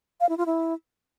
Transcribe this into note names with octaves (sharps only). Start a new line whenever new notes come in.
F5
E4
F4
E4